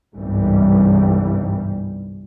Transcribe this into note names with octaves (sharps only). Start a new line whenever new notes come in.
G1 C2 G#2 E3 G3